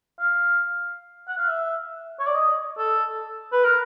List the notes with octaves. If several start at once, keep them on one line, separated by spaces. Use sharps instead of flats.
F5
F#5
F5
E5
C#5
D5
D#5
A4
B4
A#4